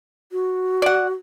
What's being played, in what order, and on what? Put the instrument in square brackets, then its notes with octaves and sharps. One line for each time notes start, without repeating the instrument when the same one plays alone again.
[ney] F#4
[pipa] D5 F#5